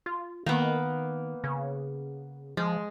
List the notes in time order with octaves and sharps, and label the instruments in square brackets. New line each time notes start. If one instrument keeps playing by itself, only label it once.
[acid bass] F4
[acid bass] D#3 [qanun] A#3 B3
[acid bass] C#3
[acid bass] F3 [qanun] G#3